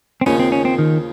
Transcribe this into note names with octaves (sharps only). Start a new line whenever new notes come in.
C4
D#2 C#3 F3 C#4
C4
C#4
C4
D#3